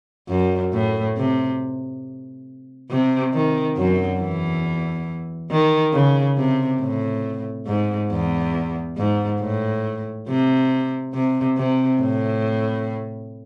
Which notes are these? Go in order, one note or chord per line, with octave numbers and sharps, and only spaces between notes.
F#2
A2
C3
C3
D#3
F#2 F#3
E2 E3
D#3
C#3
C3
A2
G#2
E2
G#2
A2
C3
C3
C3
A2